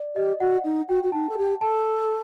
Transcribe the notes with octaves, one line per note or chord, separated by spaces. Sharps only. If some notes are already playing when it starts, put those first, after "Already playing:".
Already playing: D5
G4 D#5
F#4 F#5
D#4 F#5
F#4 G5
F#4
D#4 A5
A4
G4
A4 A5